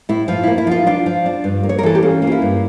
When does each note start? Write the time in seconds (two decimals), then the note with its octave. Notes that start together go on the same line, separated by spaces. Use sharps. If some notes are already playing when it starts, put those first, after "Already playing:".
0.09 A2 E4
0.28 F3 F4
0.43 A#3 E4
0.58 E4
0.67 F3 F4
0.86 D4 F4
1.06 F3
1.26 D4
1.44 G2
1.63 A#3
1.69 C#5
1.79 A#4
1.83 E3 A4
1.95 G4
2.02 C#4 F4
2.22 A#3
2.27 F4
2.32 E4
2.42 G2